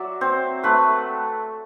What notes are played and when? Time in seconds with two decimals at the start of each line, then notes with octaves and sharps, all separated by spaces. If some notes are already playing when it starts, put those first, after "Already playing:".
Already playing: F#3 D5 E5
0.21 C4 C5
0.63 A3 B4